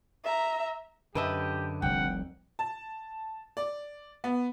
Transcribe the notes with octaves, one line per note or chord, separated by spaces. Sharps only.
E5 A#5
F#2 D3 G4 B4 D#5 E5 A5
F1 C2 F#5 G5
A5
D5
B3